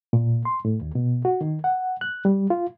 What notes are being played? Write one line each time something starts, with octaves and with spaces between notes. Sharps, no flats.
A#2
C6
A2
D#2
B2
F#4
D#3
F#5
F#6
G3
F4